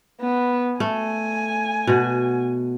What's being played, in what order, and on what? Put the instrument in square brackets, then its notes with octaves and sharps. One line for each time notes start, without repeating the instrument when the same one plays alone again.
[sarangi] B3
[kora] A3 [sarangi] G#5
[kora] B2 F#4